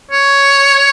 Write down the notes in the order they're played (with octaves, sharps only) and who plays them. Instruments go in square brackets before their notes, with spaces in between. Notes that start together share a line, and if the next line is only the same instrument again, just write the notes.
[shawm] C#5